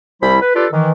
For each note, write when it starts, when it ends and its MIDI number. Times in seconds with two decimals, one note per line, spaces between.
0.23 0.38 36
0.23 0.38 55
0.23 0.38 64
0.23 0.38 72
0.23 0.38 83
0.42 0.52 71
0.56 0.67 62
0.56 0.67 65
0.56 0.67 67
0.56 0.67 69
0.56 0.67 71
0.56 0.67 74
0.73 0.92 51
0.73 0.92 52